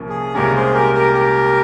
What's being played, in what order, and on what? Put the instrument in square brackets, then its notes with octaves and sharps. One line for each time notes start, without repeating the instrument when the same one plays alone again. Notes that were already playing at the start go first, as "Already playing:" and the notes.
Already playing: [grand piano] C2 A#2 F3 A#3 C#4
[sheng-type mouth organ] G#4
[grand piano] C2 A#2 G#3 C#4 [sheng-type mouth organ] G4 A#4
[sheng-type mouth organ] G#4 C5
G4 A#4
G4 A#4
G4 A#4